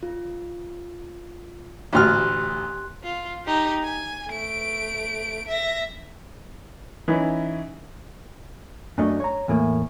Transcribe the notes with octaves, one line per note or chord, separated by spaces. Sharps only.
F4
A1 D2 G4 C6 F6 F#6
F4
D#4 G4
G#5
A3 D7
E5 A#6
E3 C#4 D#4 E4
F#2 A3 C#4 D4 D#5
C#5 A#5
E2 A2 A#3